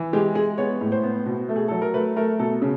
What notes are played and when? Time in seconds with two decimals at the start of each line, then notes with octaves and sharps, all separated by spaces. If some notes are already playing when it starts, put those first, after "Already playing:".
Already playing: E3
0.13 G#3 G4
0.35 G#3 G#4
0.58 B3 C#5
0.81 A2
0.92 C5
1.03 B3
1.26 B2
1.49 A3
1.56 G#4
1.68 F#3 A4
1.82 A#4
1.94 A3 B4
2.16 A3 A#4
2.39 B2 A4
2.62 C#3